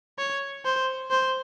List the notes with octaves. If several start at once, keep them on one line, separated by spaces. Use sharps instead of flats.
C#5
C5
C5